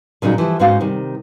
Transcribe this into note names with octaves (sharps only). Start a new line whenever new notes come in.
A#2 C#3 F#3 G3 D#4 A#4
E3 F3 G4
G#2 G#3 C#4 D#4 F#4 F5
C3 D#3 G3